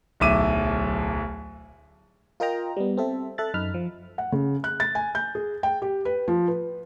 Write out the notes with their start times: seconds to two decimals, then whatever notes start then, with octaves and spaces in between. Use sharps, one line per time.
0.20 D1 B1 E5 D6 D#7
2.40 F4 A#4 D#5 G5 A#5
2.77 G3 B3
2.97 C4 A4 E5
3.38 A4 E5 F#6 A6
3.54 F#2 D#4 B5 F6
3.74 F3
4.18 F#5
4.32 C#3
4.64 F#6
4.80 A6
4.95 G#5
5.15 G6
5.35 G#4
5.63 G5
5.82 G4
6.05 B4
6.28 F3
6.48 B4